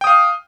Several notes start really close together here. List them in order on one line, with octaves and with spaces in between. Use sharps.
G5 D#6 F5